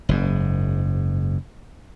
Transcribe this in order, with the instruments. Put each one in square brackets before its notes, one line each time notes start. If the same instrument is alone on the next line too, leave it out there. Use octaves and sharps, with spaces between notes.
[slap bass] F#1 G#2